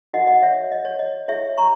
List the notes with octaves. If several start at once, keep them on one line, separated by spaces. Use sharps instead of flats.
D#4 F#4 A#4 D#5 F#5
D#5 F#5
C#5 E5
D#5
C#5
D#5
E4 G#4 C#5 E5
A#5 C#6